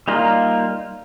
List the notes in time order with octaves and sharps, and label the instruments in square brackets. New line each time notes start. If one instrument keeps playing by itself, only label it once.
[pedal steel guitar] G3 A#3 D#4 F4 A#4